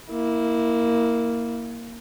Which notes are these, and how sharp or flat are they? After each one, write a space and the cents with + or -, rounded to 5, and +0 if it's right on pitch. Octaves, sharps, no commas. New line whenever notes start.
A#3 +0 E4 -20